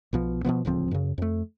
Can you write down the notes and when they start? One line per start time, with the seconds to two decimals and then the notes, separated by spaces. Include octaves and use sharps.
0.13 B1 B2 F3
0.45 B2 D#3 F3 B3
0.65 D1 C#2 F3 C4
0.91 F#2 C#3
1.18 F2 A3